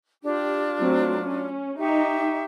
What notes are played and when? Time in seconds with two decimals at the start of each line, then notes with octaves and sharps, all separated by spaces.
0.24 D4 F4 G4
0.79 F#3 A3 C4
1.23 C#4
1.78 D#4 G4 E5 C#6